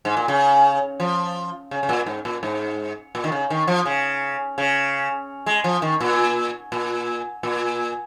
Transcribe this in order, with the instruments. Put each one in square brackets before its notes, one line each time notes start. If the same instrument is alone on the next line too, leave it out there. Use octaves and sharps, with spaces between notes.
[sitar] G#2
A#2
C#3
F3
C#3
C#3
A#2
G#2
A#2
G#2
A#2
D#3
C#3
D#3
F3
C#3
C#3
G#3
F3
D#3
A#2
A#2
A#2